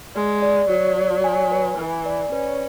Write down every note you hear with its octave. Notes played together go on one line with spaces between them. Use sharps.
G#3 D5
D5
F#3 F#4
D5
G#5
B4
E3 G#5
D5
C#4 B4